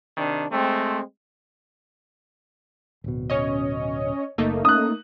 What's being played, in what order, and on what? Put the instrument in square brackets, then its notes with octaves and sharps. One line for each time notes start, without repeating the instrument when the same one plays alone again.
[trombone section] C3 D#3 D4
G#3 A3 C4
[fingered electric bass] D1 B2
[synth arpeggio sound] C#4 C#5 D#5
[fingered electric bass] F#1 [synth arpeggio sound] A3 A#3 D#4
[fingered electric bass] C#4 [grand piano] D#6 F#6